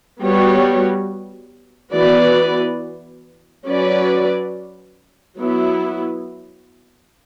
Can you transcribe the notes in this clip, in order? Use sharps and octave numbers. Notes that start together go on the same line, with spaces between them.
G3 B3 F#4 C#5
E3 B3 F#4 B4 D5
F#3 C#4 F#4 B4 D5
F#3 B3 E4